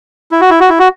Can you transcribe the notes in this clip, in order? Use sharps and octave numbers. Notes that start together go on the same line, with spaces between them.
E4
F#4
E4
F#4
E4
F#4